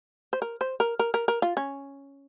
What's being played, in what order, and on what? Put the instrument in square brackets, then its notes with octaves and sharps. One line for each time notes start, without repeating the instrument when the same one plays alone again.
[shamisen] C5
A#4
C5
A#4
A#4
A#4
A#4
F4
C#4